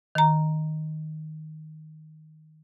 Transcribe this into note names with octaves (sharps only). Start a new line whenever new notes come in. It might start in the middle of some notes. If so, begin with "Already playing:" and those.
D#3 A#5